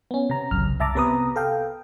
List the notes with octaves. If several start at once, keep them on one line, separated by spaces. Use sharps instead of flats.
B3 C#4
C3 A#5
G#1 C#2 F#2 F6
C2 E5 A5 A#5 D6
C3 B3 B4 A#5 D#6
A4 F5 G5